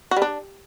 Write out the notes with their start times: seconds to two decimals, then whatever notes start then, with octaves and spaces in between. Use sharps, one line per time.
0.11 F#4
0.17 G3
0.22 D4